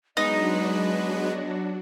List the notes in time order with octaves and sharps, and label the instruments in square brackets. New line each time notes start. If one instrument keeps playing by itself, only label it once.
[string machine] F#3 D4 F#4 [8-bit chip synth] G#3 B3 B4 [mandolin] D#4 [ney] D#5